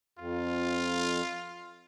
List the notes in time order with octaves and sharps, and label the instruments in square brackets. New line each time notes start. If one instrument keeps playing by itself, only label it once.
[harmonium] F2 [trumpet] F4